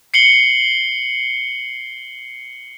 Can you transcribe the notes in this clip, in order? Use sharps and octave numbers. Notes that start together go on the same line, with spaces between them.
C7 C#7 F#7 G7